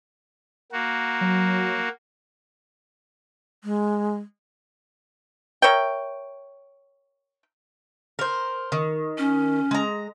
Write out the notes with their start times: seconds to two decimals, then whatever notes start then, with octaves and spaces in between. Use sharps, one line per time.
0.72 A#3 F#4
1.21 F#3
3.64 G#3
5.62 A#4 C#5 E5 G5
8.19 A#4 C5
8.72 D#3
9.18 C#4
9.71 G#3 A#5